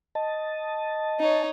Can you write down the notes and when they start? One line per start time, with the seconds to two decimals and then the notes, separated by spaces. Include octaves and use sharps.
0.15 D#5 A5
1.20 D#4 C#5